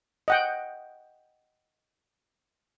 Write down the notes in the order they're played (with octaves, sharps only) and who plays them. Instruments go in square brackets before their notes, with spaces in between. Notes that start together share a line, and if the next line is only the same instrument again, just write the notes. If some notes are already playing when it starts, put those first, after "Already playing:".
[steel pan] D#5 F#5 G5